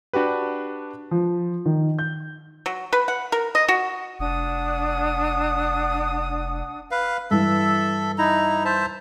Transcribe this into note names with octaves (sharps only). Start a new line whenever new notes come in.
D4 F#4 G4 B4
F3
D#3
G6
F#3
B4
F#5
A#4
D#5
F#4
F1 D4 F#5 D#6
B4 F5
G2 E3 A4 E5
D#4 E4 A#5
C5 E5 A5